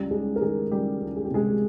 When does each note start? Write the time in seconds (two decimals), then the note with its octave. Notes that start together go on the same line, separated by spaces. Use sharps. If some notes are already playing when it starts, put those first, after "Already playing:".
Already playing: C#2 G3 G4
0.10 C#2 G#3 G#4
0.36 A#4
0.41 D#3 G#3 G#4
0.71 C#2 G3 G4
1.01 C#2
1.16 G#4
1.25 G4
1.31 C3 G#3 G#4